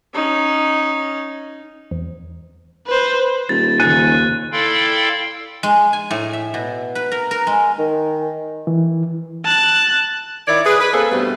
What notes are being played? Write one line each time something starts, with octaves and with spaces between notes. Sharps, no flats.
C#4 D#4
E2
B4 C5
D#1 A6
D#2 C#3 D#4 C5 G#5 F#6 A6
E4 A4 D5 F5 G5 C6
G#3
G#5
A2
E5
B2
B4
A#4
A#4
G#3
D#3
E3
A5 F#6
D#3 E4 C#5 D5
G#4 B4
B4
A#3 C4 G#4 A4
G2 B2 G3 A3 B3